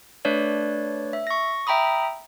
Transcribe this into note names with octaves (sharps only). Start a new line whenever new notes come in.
A3 D4 B4 C#5 D5
E5
C#6 A#6
E5 G5 A#5 B5 D#6